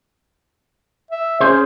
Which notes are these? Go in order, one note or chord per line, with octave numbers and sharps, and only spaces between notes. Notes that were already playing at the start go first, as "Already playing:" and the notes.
E5
C#4 G#4 C5